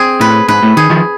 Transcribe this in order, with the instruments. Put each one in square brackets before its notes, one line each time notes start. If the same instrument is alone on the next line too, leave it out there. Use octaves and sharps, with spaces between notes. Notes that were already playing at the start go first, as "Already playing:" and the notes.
Already playing: [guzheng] C4 G#4
[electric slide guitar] A2 [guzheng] B4
[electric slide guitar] G#2 [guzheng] B4
[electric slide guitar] A2
[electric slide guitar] D#3 [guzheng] G#4
[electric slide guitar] D#3 F3